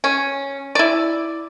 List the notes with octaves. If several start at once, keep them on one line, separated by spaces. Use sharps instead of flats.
C#4
E4 D5